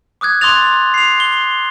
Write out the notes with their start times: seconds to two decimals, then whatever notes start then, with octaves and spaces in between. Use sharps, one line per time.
0.21 D6 D#6 F#6 G#6
0.41 C6 D6 D#6 F#6 A6 F7
0.94 C7 F7
1.20 G7